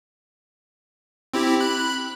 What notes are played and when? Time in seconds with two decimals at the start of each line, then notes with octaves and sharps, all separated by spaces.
1.34 C4 E4 G4
1.60 B5 F#6